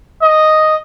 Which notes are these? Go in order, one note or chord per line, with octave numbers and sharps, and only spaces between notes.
D#5